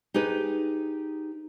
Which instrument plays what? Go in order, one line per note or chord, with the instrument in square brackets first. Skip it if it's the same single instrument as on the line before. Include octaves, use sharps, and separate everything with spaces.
[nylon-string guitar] D#4 G4 G#4 B4